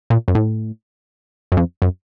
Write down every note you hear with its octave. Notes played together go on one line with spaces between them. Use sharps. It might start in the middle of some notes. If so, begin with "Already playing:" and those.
A#2
F#2
A2
F#2
F2
F#2